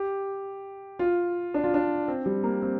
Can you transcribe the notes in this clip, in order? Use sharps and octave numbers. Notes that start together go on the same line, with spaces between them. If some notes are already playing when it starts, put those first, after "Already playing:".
Already playing: G4
F4
D4
F4
D4
C4
G3
A#3
C4